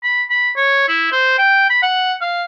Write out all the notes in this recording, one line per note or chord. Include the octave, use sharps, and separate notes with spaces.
B5
B5
C#5
E4
C5
G5
B5
F#5
F5